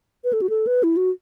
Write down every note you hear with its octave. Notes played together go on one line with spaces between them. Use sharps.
B4
A4
F#4
A4
B4
E4
F#4